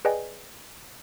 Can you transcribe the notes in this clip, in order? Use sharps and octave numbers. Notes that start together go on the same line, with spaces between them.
G#4 B4 D5 D#5 G5 G#5